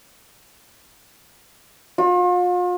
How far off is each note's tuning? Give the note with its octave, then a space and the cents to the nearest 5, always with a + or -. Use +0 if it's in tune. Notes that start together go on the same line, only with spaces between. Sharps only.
F4 +40